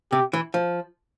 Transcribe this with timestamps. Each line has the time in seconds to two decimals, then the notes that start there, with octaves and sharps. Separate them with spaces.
0.12 C3 G4
0.33 E3
0.54 F3